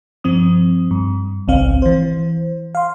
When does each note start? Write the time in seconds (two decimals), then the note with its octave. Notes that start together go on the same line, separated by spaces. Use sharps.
0.24 G2 F3 C4 D#6
0.91 G2
1.48 G#1 C#2 C4 F5
1.82 E3 C5
2.75 F5 C6